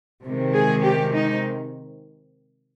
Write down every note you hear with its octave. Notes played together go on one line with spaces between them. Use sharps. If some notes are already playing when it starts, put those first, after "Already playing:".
C3 D#3 G#3
G#4
G4
D#4